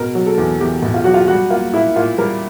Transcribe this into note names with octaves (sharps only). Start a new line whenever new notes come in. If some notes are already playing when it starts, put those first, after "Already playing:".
Already playing: B2 A#4
F#3
A4
E2
E2 G4
B2
F4
F#3 F#4
F4
G3 F#4
A#3 F4
A#2 E4
A#2 F4
G3 A#4